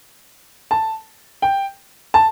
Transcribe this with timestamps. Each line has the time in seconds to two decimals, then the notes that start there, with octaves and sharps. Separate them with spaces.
0.71 A5
1.42 G5
2.14 A5